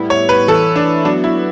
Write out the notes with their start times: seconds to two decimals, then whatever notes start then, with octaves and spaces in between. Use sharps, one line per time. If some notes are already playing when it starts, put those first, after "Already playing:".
Already playing: A2 G3 B3 E4
0.10 C#5
0.29 B4
0.48 E3 A3 E4 A4
0.76 D4
1.05 F#3 B3 D4 F#4
1.24 E4